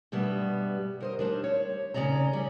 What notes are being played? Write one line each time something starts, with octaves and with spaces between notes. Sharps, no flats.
G2 B2 G3 B3 E5
A#4 C5 D#5
G3 D4 C5
C#5
D#2 C#3 F3 D5 D#5 A#5
G3 C#4